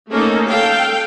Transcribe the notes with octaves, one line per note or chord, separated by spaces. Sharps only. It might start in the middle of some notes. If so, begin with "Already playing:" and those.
A3 A#3 C#4 D#4 A4 A#4
A4 F5 G5